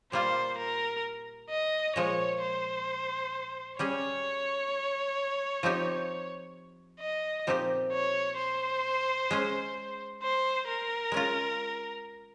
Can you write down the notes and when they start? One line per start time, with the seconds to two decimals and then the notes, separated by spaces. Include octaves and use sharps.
0.12 A#2 G3 A#3 F4 C5
0.58 A#4
1.50 D#5
1.96 A#2 F3 G#3 C#5
2.42 C5
3.79 G3 C#4 G#4 C#5
5.63 F3 C4 D#4 G4
7.00 D#5
7.47 A#2 F3 C4 D#4 G4
7.93 C#5
8.38 C5
9.31 G#3 C#4 G#4
10.22 C5
10.68 A#4
11.12 G#3 C#4 F4